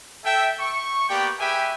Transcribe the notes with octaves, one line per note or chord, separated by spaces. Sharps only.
A4 E5 G5
C#6
A#3 B3 G4 D5 G5
G4 G#4 B4 E5 G5 G#5